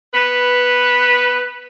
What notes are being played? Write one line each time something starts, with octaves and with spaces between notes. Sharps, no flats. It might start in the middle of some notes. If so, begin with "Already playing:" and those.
B3 B4